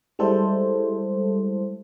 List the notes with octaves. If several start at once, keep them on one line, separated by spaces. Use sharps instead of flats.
G3 G#3 E4 A4 C5